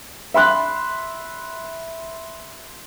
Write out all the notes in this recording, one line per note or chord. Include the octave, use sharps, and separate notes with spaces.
E5 B5 C6 F#6